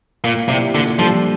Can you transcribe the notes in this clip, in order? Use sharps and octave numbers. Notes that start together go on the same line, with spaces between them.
A#2 A#3
C3 E4 G4 D5
A#2 D3
F3 G3 D4 A4